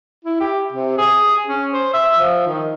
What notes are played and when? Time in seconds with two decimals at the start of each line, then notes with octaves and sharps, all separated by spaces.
0.25 E4
0.40 G4
0.73 C3
0.98 G#4
1.47 C#4
1.72 C5
1.94 E5
2.18 F3
2.47 D#3